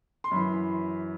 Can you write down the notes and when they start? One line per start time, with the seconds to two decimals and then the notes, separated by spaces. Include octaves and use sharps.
0.24 C6
0.31 F#2 E3 B5